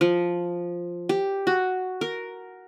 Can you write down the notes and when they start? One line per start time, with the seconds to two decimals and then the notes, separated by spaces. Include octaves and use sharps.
0.01 F3
1.09 G4
1.47 F#4
2.01 A#4